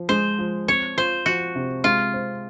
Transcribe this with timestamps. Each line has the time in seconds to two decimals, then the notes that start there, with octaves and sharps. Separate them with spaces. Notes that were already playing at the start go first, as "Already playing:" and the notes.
Already playing: F3
0.09 G#3 C5
0.39 F3
0.68 C4 C#5
0.97 F4 C5
1.26 F3 F#4
1.55 C3
1.84 G#3 F4
2.14 C4